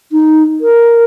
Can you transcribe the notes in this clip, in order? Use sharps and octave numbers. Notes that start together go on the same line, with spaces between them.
D#4
A#4